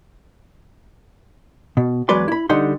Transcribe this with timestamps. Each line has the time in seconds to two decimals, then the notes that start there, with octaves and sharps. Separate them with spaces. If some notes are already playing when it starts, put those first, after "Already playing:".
1.77 B2
2.09 E2 F#3 G#3 B4 D5 C6
2.28 E4 B5
2.49 D3 G3 D#4 F#5 C6